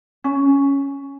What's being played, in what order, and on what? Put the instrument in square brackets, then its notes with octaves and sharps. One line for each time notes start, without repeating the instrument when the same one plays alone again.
[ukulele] C#4